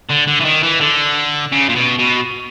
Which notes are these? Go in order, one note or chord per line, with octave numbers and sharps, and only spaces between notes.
D3
D3
E3
D#3
E3
D3
C#3
A#2
B2
B2